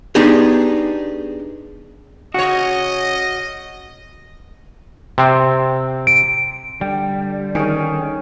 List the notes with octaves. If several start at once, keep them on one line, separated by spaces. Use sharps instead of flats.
B3 D4 D#4 G4 G#4
C#3 F#4 C#5 D#5
C3 C4
D7
D3 G3 G5
D#3 C#4 G#4